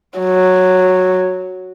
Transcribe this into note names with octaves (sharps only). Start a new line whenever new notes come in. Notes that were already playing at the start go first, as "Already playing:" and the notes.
F#3